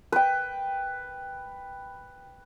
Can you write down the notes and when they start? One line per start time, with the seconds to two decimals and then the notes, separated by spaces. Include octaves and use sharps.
0.12 B4 G5